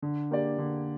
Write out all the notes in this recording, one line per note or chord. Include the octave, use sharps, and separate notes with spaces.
D3
A#3 G4 D5
D3